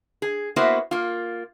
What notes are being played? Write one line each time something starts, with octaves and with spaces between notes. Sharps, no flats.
G#4
A#3 B3 E4 F#4 C5
A#3 F4